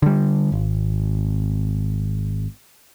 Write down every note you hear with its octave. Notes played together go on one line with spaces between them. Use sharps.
D3 G3
G#1